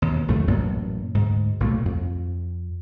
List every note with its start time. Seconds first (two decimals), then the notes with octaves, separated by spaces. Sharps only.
0.02 D#2 B2
0.28 A#1 F2 D3 A3
0.47 A1 F#2 A#2 A#3
1.15 D2 G#2
1.60 B1 A#2 F#3 A3
1.85 F2